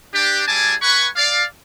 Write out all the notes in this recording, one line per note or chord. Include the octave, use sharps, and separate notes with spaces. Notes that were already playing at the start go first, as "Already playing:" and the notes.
D4 G4
G3 E4 G#4 G#5 A5 D6
B4 F#5 G#5 B5 C#6
D5 F5